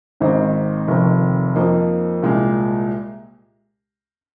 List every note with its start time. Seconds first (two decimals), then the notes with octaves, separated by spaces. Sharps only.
0.20 G#1 G#2 D#3 C4 D#4
0.88 F1 F2 D#3
1.56 F2 F3 A#3 D#4
2.22 C2 A#2 G#3